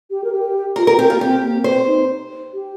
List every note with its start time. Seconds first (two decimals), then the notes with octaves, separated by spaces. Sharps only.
0.11 G4
0.24 A#4
0.32 G4
0.76 F4 A#4
0.87 G4 A#4
0.98 C4 G4
1.09 A#3 F4
1.21 C4 G4
1.42 A#3
1.64 C4 C5
1.86 D#4
2.53 G4